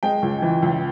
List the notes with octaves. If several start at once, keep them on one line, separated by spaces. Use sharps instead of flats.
G#3 G5
C#2
E3
C#2